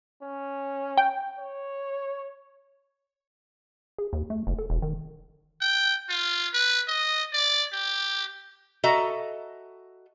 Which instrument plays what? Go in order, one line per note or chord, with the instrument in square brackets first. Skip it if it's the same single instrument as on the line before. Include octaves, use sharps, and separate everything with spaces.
[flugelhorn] C#4
[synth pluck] G5
[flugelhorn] C#5
[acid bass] G#4
D#2
A3
F#1
A4
E1
D#3
[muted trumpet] G5
F4
B4
D#5
D5
G4
[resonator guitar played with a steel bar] F#4 A4 D#5 E5 A#5